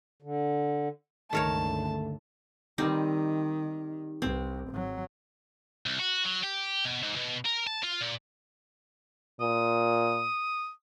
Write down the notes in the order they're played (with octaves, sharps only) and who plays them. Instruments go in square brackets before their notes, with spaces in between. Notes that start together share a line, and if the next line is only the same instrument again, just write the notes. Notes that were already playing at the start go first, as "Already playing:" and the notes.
[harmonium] D3
[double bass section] C#2 G2 D3 [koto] D#3 A#4 C#5 [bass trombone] A3 [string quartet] A5
[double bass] D#3 [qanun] G3 C4 D#4
[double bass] C2 [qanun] C4
[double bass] G#1 F#3
[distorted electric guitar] C2
F#4
F#3
G4
B2
G#2
B2
A#4
A5
F4
A#2
[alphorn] A#2 [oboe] D#6